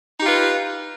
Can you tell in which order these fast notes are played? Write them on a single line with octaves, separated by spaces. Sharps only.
D#4 G4 F4 B4